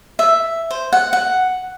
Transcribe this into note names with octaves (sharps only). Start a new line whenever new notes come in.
E5
C5
F#5
F#5